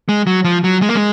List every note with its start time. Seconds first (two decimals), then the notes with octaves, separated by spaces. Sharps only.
0.09 G#3
0.27 F#3
0.45 F3
0.64 F#3
0.82 G#3
0.89 A#3
0.96 G#3